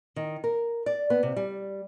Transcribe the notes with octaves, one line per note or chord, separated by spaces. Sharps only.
D#3
A#4
D5
B3
C3
G3